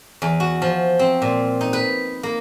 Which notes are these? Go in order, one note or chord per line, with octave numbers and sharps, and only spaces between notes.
E2
F#4
F3
C4
A#2
D#4
B4
A#3